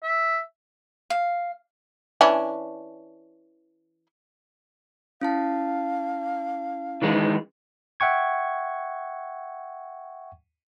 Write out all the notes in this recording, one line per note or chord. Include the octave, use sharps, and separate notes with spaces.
E5
F5
E3 C#4 D4
C#4 E4 F5 A5
D#3 E3 G#3
E5 F#5 G5 C#6 G#6